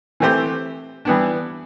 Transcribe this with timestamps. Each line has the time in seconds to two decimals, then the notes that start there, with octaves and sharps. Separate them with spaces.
0.20 E3 A3 C4 G4 C5
1.05 E3 G3 B3 D4